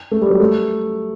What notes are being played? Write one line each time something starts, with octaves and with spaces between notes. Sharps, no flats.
A3
G3
F#3
A3